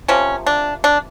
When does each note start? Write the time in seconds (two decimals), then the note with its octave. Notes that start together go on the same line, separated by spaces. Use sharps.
0.08 C3 F3 A#3 C#4
0.46 D4
0.84 D4